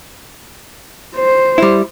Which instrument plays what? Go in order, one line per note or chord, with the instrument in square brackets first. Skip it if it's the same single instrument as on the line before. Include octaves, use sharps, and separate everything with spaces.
[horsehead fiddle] C5
[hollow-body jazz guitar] G3 E4